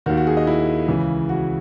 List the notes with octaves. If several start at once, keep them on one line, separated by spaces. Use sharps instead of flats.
D#2 D#3 F#4
F#4
G#4
D#5
E4
C#2 C#3 E3
F#4